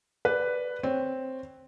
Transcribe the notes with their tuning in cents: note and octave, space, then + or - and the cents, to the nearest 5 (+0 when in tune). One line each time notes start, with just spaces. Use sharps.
B4 +5 D5 +0
C4 +0 C#5 +0